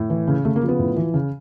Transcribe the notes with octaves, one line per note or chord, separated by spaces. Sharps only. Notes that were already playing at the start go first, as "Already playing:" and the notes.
Already playing: A2
E3
C#3
C#3 A3
A#3
F3
B3
A2
E3
C#3